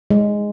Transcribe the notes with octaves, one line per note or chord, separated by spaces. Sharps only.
G#3